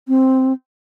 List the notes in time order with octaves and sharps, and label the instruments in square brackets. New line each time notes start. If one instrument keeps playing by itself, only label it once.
[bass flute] C4